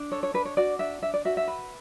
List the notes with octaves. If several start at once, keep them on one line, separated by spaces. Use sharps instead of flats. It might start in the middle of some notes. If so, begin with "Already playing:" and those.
Already playing: D4
A4 C#5
C#5
D4 B4
C#5
F#4 D5
D4 E5
D4 E5
D5
F#4 E5
E5
B4